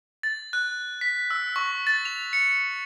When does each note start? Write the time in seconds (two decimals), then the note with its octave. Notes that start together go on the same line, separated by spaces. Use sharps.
0.23 A6
0.53 F#6
1.01 B6
1.30 E6
1.56 C#6
1.87 A6
2.05 F7
2.33 C#7